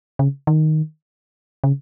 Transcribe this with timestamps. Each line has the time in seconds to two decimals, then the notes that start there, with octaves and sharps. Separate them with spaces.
0.19 C#3
0.47 D#3
1.64 C#3